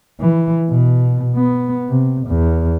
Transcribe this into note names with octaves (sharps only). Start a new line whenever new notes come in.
E3
B2
B3
C3
E2